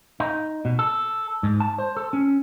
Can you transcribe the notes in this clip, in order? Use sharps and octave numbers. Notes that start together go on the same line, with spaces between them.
D#4
B2
A4
G#2
A5
C5
A4
C#4